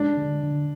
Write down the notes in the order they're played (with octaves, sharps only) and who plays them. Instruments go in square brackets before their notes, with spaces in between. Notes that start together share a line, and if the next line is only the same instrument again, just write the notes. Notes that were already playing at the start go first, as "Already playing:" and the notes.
Already playing: [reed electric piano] G#3 [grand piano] D4
[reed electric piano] D3
D3